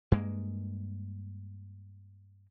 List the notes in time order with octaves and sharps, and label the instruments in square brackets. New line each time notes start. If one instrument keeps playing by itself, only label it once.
[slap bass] G2 G#3 A#3